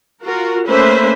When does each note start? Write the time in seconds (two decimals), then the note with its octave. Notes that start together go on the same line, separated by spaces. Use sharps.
0.22 F4 F#4 A#4
0.67 A3 A#3 C#4 B4 C5 E5